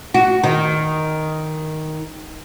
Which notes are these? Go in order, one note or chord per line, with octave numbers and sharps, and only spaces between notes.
F#4
D#3